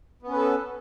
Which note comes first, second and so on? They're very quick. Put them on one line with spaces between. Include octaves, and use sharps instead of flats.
B3 C#4 B4 A4